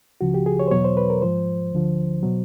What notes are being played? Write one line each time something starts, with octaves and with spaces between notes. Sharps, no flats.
C#2 C#3 F3 F#4
G4
G#4
C#5
C5
E2 B2 F#3 C#5
C5
B4
A#4
G#2 F3 C5
D2 D3 F3
B2 F#3